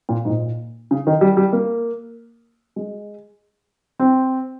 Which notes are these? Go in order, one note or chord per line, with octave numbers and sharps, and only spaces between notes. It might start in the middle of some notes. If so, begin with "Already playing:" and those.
A#2
G#2
A#2
C#3
D#3
G3
G3
A#3
G#3
C4